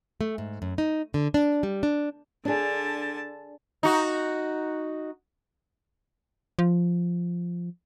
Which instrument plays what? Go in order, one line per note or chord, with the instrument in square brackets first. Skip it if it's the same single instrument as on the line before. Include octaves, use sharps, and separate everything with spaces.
[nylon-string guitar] A3
G#2
F#2
D#4
D3
D4
G3
D4
[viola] D3 A5 [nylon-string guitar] D4 G#4
[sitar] D#4 F#4
[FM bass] F3